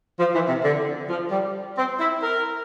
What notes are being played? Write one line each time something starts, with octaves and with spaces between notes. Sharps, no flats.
F3
E3
C3
D3
F3
G3
C4
E4
A#4